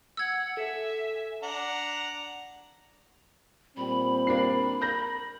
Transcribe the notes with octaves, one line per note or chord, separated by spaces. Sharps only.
F#5 E6 G#6
A4 E5 G#5
D4 F#5 A#5
A#2 G3 C4 B5
A#3 D4 C7
A#4 B5 G6 A#6